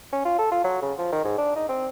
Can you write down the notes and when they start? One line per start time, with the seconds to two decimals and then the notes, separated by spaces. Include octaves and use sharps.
0.13 C#4
0.25 F4
0.39 A4
0.52 F4
0.64 F#3
0.82 C#3
0.99 F3
1.12 D#3
1.24 G#2
1.38 D4
1.56 D#4
1.69 C4